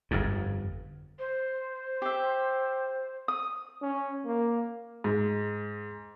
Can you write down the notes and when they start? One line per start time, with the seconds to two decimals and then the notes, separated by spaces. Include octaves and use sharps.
0.11 G1 F2 G#2
1.19 C5
2.02 G4 E5
3.28 D#6
3.82 C#4
4.26 A#3
5.04 G#2